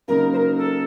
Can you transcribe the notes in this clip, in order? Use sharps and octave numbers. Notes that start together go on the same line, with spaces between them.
C#3 F#3 A#3 D#4 A#4
C5
A#4
A4